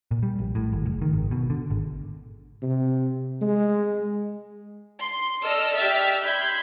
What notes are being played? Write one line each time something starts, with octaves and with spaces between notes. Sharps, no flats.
A#2
G3
A#1
A2
G#1
F#1
D#3
G#1
B2
D3
G#1
C3
G#3
C6
A4 D5 D#5 E6 F6
G4 D5 E5 F6 A6 B6
B5 C6 G6 G#6